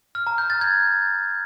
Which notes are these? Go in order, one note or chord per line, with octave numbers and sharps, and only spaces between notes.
F6
A#5
G6
A6
G#6